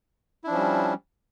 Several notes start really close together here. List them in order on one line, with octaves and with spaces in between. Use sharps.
E4 D4 F3 C#4 G3